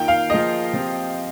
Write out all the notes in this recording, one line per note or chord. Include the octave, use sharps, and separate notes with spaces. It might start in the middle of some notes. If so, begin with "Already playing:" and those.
Already playing: D#3 A#3 F4 G5
F5
F3 A#3 F4 G#4 D#5
F3 C4 G4